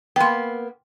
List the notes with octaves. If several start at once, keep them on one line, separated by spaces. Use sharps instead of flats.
A#3 B3 G5 C6